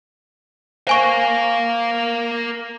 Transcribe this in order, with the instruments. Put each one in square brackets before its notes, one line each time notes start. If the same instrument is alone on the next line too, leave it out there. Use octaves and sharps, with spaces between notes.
[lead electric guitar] A#4 F5 [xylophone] C5 G#5 C#6